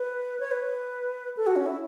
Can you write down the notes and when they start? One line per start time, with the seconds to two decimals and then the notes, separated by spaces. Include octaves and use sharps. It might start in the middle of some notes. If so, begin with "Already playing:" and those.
Already playing: B4
0.40 C#5
0.51 B4
1.37 A4
1.47 F#4
1.56 C#4
1.66 E4